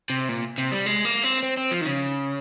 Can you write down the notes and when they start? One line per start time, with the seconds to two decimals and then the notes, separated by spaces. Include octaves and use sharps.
0.10 C3
0.29 A#2
0.58 C3
0.72 G3
0.86 G#3
1.05 A#3
1.24 C4
1.43 C4
1.57 C4
1.71 F3
1.81 D#3
1.86 C#3